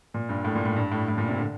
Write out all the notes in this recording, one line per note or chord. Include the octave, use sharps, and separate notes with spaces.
A#2
G2
A2
A#2
A2
G2
A2
A2
A#2
C3
D3